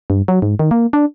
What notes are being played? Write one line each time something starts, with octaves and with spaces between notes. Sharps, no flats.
G2
F#3
G#2
D#3
A#3
D4